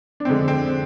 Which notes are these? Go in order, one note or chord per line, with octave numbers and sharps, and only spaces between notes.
D4
F2 D3 G#3 C4
C4